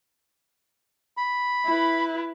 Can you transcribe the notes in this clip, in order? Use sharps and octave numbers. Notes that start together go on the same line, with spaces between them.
B5
E4 B4